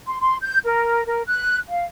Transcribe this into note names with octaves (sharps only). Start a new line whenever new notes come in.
C6
C6
G6
A#4
A#4
F#6
F5